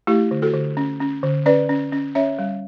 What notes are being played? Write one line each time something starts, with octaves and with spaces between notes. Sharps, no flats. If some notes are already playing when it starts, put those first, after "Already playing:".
A3 E4 G4
D3
F#4 A4
D3
C#4
C#4
D3
C#4 B4 D5
C#4
C#4
C#4 C#5 E5
G3